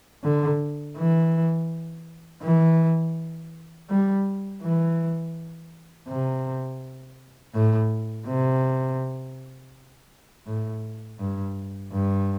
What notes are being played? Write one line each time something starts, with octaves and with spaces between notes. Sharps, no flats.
D3
E3
E3
G3
E3
C3
A2
C3
A2
G2
G2